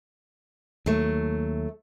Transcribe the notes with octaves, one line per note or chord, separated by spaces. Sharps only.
D#2 F#3 A3